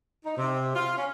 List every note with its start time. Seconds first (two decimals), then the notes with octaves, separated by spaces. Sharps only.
0.24 D#4
0.37 C3
0.75 F4
0.97 C#4